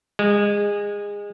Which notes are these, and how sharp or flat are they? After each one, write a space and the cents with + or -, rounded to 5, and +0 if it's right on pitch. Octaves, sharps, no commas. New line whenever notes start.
G#3 -25